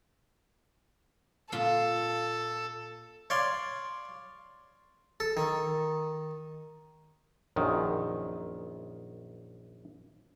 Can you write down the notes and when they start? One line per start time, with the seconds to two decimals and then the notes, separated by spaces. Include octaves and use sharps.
1.52 A#2 F4 A4
3.30 C#5 D5 F5 C6
5.20 A4
5.37 D#3
7.56 A#1 F#2 D#3